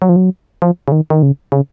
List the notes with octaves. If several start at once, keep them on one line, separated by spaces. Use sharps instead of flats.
F#3
F3
F#3
F3
C#3
D#3
D#3
C#3
C#3